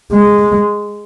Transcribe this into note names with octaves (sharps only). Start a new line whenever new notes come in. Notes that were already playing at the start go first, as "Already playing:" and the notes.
G#3